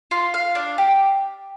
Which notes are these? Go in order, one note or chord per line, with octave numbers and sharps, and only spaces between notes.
F4
F5
D4
G4